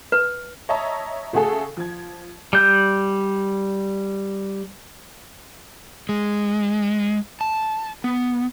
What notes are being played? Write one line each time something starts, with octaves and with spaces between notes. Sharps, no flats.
B4
C#5 D#5 E5 A5 A#5
C#3 A3 F#4 G#4 A4
F3 G#6
G3 G6
G#3
A5
B3